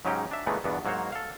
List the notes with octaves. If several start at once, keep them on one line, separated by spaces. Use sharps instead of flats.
G#2 C#3 F#3 C#4 D#4 G4
D4 E5
A#2 C#3 E3 G#3 A3 B3
E2 G2 B2 B3 D4
G#2 F#3 A#3 F#4 C5 C#5
A4 F5